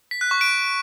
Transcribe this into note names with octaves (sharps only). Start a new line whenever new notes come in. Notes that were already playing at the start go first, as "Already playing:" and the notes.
B6
F#6
C#6
D7